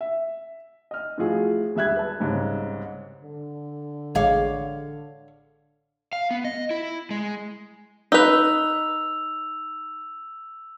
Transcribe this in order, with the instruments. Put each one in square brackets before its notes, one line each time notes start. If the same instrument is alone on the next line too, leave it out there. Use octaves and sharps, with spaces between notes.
[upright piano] E5
D#5 F6
A2 E3 F3 F4 F#4 G#4
E1 G3 E5 F#6 G#6
B4 A5
C2 G#2 C#3
[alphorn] D3
[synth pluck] A1 G#3 [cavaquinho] C#5 F5 D6
[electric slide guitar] F5
B3
D#5
E4
G#3
[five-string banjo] D#4 B4 [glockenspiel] E6 F7